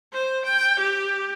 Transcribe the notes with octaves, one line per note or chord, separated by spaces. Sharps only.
C5
G5
G4